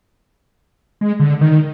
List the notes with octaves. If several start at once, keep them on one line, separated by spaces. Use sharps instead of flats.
G#3
D3
D#3